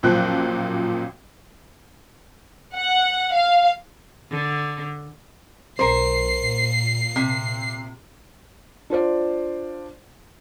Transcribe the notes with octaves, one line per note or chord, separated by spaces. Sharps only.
A1 F#2 A#2 F3 G5 F#6
F#5
F5
D3
B1 A#4 C5 C7
A#2
C3
D4 F4 C5 D5